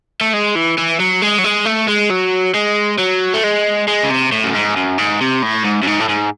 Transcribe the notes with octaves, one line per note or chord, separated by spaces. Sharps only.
A3
G#3
E3
E3
F#3
G#3
F#3
G#3
A3
G#3
F#3
G#3
F#3
A3
G#3
G#3
C#3
C3
A2
F#2
G#2
F#2
G#2
C3
A2
G#2
F#2
G#2
A2
G#2